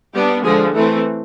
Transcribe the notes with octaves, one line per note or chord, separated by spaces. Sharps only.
G3 B3 D4 G4
D3 F3 G#3 G#4
E3 A3 C4 A4